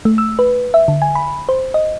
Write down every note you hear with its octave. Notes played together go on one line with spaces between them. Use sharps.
A3
E6
B4
E5
D3
G#5
B5
C5
D#5